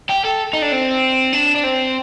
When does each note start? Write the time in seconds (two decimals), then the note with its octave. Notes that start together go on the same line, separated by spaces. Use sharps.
0.10 G4
0.25 A4
0.53 D#4
0.62 D4
0.72 C4
1.33 D4
1.55 D4
1.64 C4